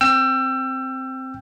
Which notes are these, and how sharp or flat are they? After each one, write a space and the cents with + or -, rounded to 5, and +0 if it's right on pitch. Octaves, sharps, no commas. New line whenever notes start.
C4 +0 G5 +0 E6 +30